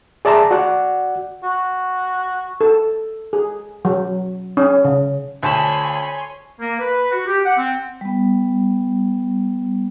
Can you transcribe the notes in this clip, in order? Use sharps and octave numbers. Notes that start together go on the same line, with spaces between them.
G#4 D5 E5 A5 A#5 C6
F#4 D5 F#5
F#4
A4
G#4
F#3
C#4
C#3
D2 C5 C#5 G#5 A5 B5 C6
A#3
B4
F#4
G4
F#5
C4
G3 B3